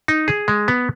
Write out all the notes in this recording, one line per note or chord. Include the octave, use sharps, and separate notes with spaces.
D#4
G#4
G#3
B3